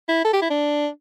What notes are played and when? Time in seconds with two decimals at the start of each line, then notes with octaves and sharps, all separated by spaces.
0.09 E4
0.25 A4
0.33 G4
0.42 E4
0.50 D4